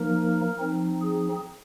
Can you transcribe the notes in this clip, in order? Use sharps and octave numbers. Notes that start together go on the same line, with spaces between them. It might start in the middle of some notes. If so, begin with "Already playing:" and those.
Already playing: F3 A#3 D#4 A#4
F3 C4 D#4
G#4